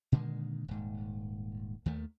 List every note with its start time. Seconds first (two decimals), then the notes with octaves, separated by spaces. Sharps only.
0.12 A#2 D3 D#3 G#3
0.68 D#1 G#2
1.86 D#2 D#3 A3